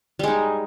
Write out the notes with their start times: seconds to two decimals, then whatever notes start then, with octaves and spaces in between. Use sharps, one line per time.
0.19 G3
0.23 G#3
0.28 D#4